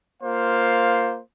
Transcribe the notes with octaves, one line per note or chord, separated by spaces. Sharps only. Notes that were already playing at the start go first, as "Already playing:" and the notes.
A#3 F4 C5 F5